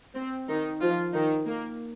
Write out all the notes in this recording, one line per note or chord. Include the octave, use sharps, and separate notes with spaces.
C4
D#3 D#4
F3 F4
D#3 D#4
A#3